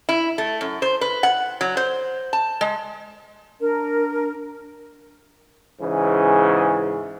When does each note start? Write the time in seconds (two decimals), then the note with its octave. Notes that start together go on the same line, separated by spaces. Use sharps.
0.09 E4
0.38 A3
0.61 F#2
0.82 C5
1.01 B4
1.23 F#5
1.61 F#3
1.77 C5
2.33 A5
2.61 G#3
3.59 D4 A#4
5.80 G#2 C#3 E3